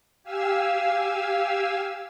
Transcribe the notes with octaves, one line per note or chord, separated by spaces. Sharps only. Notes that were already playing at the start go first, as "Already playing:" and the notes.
G4 F5 G#5 E6